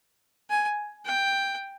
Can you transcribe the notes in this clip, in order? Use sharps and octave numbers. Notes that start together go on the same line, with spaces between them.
G#5
G5